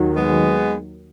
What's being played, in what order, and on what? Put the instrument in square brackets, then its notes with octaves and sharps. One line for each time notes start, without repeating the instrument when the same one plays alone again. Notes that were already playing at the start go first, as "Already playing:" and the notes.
Already playing: [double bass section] D#2 D#3 F#3
[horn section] G#3 B3